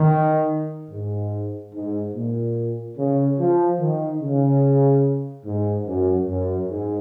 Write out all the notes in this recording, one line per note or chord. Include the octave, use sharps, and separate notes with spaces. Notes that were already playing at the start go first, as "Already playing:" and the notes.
Already playing: D#3
G#2
G#2
A#2
C#3
F3
D#3
C#3
G#2
F#2
F#2
G#2